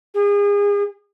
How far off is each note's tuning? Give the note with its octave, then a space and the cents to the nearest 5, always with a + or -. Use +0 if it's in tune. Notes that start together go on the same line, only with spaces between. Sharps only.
G#4 -35